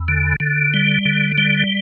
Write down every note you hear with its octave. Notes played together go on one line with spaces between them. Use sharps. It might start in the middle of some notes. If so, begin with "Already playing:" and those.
Already playing: E2
D3
D3
G3
D3
G3